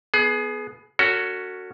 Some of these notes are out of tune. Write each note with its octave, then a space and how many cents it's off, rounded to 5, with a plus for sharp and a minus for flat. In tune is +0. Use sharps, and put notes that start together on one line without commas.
B3 +0 G#4 +25
C#4 +10 F#4 +0 A4 +40